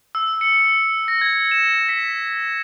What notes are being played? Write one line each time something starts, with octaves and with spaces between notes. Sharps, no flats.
E6
C#7
A#6
G#6
E7
B6